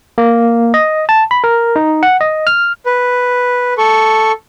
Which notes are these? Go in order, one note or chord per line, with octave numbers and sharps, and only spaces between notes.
A#3
D#5
A5
B5
A#4
D#4
F#5
D#5
F6
B4
A4 C#6